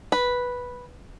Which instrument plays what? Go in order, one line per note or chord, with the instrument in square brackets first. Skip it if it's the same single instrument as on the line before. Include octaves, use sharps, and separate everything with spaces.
[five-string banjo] B4